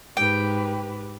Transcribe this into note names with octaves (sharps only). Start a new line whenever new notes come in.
G#2 G4 B4 G5